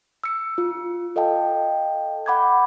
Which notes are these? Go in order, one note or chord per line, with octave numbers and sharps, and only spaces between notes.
E6 C#7
F4
A4 D#5 F5 G5 A5
F#5 B5 D6 G6 G#6